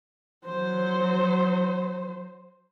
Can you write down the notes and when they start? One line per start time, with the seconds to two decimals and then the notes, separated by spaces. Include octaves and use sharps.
0.46 F#3 C5